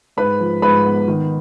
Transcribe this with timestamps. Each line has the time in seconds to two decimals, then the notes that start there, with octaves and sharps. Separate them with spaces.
0.17 G#2 B4 B5
0.40 F3
0.62 G#2 B4 B5
0.84 B3
1.08 D#3